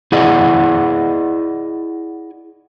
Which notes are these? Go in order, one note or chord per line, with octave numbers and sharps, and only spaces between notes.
E4 G#4 D5 D#5 F#5